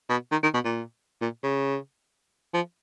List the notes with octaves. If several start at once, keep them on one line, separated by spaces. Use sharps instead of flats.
B2
D#3
D#3
B2
A#2
A#2
C#3
F3